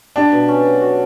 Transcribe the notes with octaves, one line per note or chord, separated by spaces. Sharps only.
D4 G4
B2
C#4
F#3
F#4